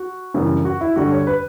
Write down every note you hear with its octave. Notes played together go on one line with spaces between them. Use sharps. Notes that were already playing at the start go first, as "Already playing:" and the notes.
Already playing: F#4
F#2 C#3 E3 G3
F#4
E4
G2 D3 G3 F#4
C#5
B4